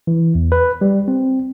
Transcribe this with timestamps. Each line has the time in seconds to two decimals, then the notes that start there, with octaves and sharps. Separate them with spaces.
0.07 E3
0.35 E2
0.52 B4
0.81 G3
1.08 C4